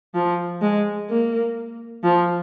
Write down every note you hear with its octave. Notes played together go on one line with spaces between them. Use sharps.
F3
G#3
A#3
F3